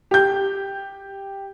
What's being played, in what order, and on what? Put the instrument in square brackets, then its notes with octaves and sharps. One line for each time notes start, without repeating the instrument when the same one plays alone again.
[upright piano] G4 G6